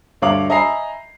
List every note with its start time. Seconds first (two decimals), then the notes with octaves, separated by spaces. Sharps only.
0.22 D2 G2 C#5 F5 D6 F#7
0.50 D#5 E5 G#5 A#5 B5 C7